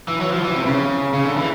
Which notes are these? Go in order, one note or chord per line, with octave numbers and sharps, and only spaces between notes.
E3
F#3
F3
E3
C3
C#3
C#3
D3
E3